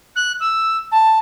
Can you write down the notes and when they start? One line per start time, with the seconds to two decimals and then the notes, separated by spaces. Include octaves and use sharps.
0.15 F#6
0.40 E6
0.91 A5